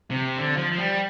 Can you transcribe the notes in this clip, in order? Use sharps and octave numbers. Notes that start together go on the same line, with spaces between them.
C3
D3
F3
F3
G3